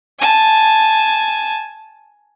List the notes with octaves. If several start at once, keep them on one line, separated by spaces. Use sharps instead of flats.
G#5 A5